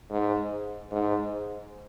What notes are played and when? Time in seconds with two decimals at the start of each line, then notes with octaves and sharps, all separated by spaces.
0.10 G#2
0.91 G#2